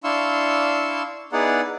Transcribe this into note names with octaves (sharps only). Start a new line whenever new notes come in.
D4 E4 F5 C6 C#6 E6
B3 D#4 E4 G#4 D5 F#5